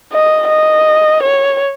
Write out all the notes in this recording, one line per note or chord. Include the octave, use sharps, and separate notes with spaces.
D#5
D#5
C#5